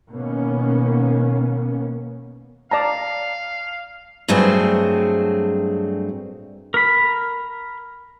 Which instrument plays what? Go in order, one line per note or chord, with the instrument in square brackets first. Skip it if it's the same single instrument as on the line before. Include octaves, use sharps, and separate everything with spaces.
[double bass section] B2 D#3 A#3 B3 C#4
[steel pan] D5 A5 A#5 [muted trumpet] F5
[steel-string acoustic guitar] G2 F#3 A3 C4 G#4
[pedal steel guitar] A#4 B5